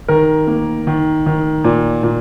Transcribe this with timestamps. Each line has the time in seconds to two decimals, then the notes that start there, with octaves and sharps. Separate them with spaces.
0.08 D#3 A#4
0.47 A#3
0.87 D#3
1.26 D#3
1.64 A#2
2.03 A#2